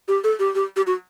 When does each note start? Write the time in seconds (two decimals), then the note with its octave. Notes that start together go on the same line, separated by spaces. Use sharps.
0.08 G4
0.24 A4
0.39 G4
0.55 G4
0.76 G4
0.87 F#4